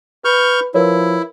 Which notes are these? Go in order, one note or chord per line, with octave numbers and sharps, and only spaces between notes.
B4 C#6 F6 G6
F3 E4 A#4 B4 C#5